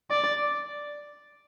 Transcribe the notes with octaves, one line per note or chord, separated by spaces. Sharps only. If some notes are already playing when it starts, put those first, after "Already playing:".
D5